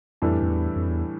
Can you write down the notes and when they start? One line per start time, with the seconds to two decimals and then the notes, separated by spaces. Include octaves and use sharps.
0.22 F2 A2 E3 G3 D4 A4
0.42 F2
0.49 E2
0.76 F2
0.89 E2